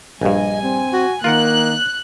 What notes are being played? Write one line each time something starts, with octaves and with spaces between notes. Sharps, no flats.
A#1 G2 G3 D#5 G#5
C4
F#4
D#3 A#3 F4 A#4 F#5 F#6